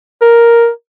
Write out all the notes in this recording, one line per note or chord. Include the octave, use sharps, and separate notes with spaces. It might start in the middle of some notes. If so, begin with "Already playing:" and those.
A#4